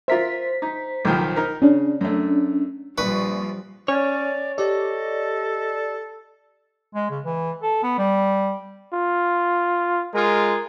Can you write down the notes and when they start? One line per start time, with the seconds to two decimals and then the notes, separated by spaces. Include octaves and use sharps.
0.08 F4 A#4 C5 E5 B6
0.62 D#4
1.05 B1 D#3 F3
1.36 D#4 A#4
1.62 C#3 C#4 D4
2.01 F#2 A3
2.98 A#1 F3 G3 B4 C#6
3.88 C#4 C#5 D5
4.58 G4 A4 D5 D#5
6.95 G#3
7.10 C#3
7.25 E3
7.62 A4
7.83 B3
7.98 G3
8.94 F4
10.14 G#3 F4 G#4 A#4